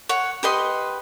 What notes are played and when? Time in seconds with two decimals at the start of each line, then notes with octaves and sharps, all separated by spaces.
0.09 C#5 F#5
0.43 G4 B4 D#5 C6